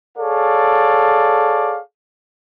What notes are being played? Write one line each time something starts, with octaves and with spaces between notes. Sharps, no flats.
G#4 A4 C#5 D5 F5